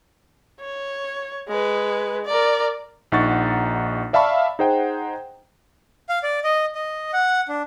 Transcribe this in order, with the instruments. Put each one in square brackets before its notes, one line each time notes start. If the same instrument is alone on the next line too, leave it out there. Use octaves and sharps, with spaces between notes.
[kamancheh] C#5
G#3 B4
A#4 D5
[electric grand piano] A#1 D#4 F#5 C#6 A6
D5 E5 F5 A5 B5 C#6
D#4 G#4 C5 F#5 G5
[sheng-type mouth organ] F5
D5
D#5
D#5
F#5
D4